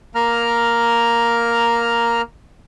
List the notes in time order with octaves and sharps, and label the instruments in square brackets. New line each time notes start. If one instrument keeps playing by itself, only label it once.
[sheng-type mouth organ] A#3 A#5 F6